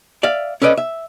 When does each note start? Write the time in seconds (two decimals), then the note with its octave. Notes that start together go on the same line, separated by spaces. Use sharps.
0.23 D5 E5 F5
0.62 C#4 A4 B4 D5 D#5
0.77 E5